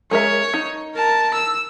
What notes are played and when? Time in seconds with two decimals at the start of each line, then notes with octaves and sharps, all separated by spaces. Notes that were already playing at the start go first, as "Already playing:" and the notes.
0.11 G#3 A#4 C#5 E5
0.54 D#4
0.95 A#4 A5
1.34 E6